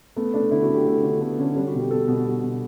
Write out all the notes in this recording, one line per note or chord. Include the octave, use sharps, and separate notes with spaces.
A3 B3
A3 D4
D3 E4
F#4
D3
G4
A3
D3
A3 B3
D3 C#4
G3 D4
F#4
B2
G4
B2 A4
B2
G3
B2